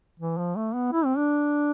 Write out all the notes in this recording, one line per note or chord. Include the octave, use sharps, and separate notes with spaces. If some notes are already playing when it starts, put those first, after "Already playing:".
E3
F3
A3
B3
E4
C4
D4